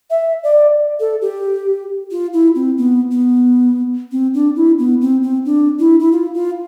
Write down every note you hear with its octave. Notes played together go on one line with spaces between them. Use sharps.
E5
D5
A4
G4
F4
E4
C4
B3
B3
C4
D4
E4
B3
C4
C4
D4
E4
E4
F4
F4